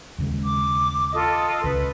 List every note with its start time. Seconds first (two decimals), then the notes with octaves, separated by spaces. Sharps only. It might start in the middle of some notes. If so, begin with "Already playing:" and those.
0.18 D#2 C#3 G#3
0.43 D6
1.14 F4 A4 D#5
1.64 C#2 C#3 B4